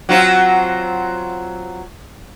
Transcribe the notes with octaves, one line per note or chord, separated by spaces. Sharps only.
F#3 C4 F4